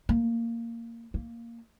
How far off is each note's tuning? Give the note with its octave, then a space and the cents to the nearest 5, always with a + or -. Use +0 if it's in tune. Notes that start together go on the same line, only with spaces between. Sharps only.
A#3 -15
A#3 -5